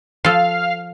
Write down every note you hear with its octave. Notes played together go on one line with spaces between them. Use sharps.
F3 A4 F5